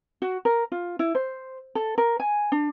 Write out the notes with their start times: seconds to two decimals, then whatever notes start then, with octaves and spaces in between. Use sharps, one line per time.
0.22 F#4
0.45 A#4
0.72 F4
0.99 E4
1.15 C5
1.75 A4
1.98 A#4
2.20 G#5
2.52 D4